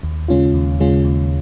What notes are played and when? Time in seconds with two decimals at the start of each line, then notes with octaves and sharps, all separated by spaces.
0.03 D#2
0.28 C#3 G#3 C#4 F4
0.54 D#2
0.80 C#3 G#3 C#4 F4
1.05 D#2